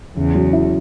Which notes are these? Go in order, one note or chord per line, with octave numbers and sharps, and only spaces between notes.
E2 C#3
F#3
E4